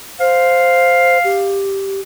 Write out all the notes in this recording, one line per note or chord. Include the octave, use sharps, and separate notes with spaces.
C5 F5
G4